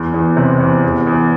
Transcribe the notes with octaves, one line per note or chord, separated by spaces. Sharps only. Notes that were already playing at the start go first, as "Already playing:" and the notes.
Already playing: E2
E2
C3
E2
E2
E2